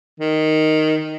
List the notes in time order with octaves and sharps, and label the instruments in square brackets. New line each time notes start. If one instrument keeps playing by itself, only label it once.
[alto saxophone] D#3